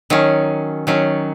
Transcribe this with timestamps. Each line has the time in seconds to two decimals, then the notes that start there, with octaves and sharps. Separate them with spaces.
0.10 D#3 F#3 C#4
0.87 D#3 F#3 C#4